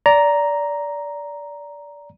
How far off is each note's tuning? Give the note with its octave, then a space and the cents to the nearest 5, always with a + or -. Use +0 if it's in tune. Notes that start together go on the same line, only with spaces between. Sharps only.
D5 -15 A#5 +0